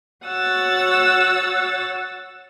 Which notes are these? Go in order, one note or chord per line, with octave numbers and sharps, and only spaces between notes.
F#4 C#5 F#5 E6 A6